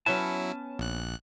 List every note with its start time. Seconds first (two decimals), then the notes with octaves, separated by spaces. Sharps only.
0.06 F#3 B3 C#4 E4 A5
0.79 A#1 F#6